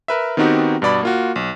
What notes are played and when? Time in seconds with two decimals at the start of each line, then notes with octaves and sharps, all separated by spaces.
0.08 A#4 B4 E5
0.37 D#3 B3 C4 D#4 F#4 G4
0.82 G2 B2 D5 B5
1.03 A#3 F4 F#4
1.36 B1